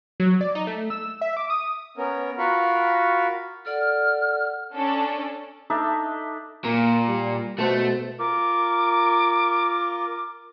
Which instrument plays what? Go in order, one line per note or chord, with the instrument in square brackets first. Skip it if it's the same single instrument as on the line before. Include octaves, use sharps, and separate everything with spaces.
[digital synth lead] F#3
D5
D#4
A3
E6
E5
D6
D#6
[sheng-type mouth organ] B3 C#4 A#4
F4 F#4 A#4 F5 B5 C#6
[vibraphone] A4 D5 F#5 [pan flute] F6
[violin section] C#4 D4 A4
[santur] D4 D#4 A4 E5
[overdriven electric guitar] A#2 [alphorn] A#3
[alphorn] G3
[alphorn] B2 [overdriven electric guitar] A3 [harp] A4 C5 F#5
[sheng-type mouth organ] F4 A#4 [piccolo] D6